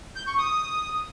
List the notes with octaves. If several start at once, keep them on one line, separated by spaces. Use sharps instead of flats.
G6
C#6
D#6